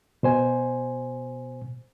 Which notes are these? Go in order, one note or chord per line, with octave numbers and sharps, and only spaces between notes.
B2 C5 G#5